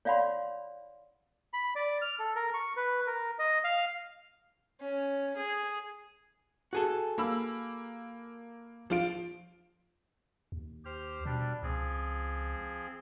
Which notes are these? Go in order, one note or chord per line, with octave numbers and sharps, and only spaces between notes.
C#5 D5 F5 F#5 B5 C6
B5
D5
F6
A4
A#4
C#6
B4
A#4
D#5
F5
C#4
G#4
F#4 G#4 A4
A#3 B5 E6
F3 F4 D7
D#2
G4 C5 F6
B2 G3 D4
C#2 F3 C4 G#4